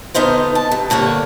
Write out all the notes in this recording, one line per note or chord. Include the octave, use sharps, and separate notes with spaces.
D3 B3 D#4 F4 C5
A5
G2
G2 D3 A#3 C#5